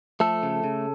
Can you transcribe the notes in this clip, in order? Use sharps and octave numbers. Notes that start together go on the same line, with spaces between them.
F3 A3 A4
C#3
C#3